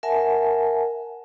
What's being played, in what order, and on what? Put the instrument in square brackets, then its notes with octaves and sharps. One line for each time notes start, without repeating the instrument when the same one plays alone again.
[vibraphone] A#4 E5 F#5 G#5 A5